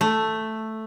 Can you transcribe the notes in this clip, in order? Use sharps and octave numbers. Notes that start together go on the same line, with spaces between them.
A3